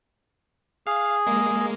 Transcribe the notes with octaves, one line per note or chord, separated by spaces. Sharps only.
G#4 F5
G#3 A#3